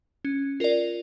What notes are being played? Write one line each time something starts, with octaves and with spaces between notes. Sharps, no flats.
C#4
F4 A#4 D5